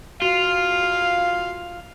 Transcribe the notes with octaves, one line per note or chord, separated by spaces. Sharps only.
F4 F#4 F5 C7 F7